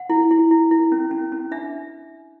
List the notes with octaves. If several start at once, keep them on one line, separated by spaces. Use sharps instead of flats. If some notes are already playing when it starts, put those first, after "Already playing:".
Already playing: F#5
E4
E4
E4
E4
C#4
C#4
C#4
D4 E5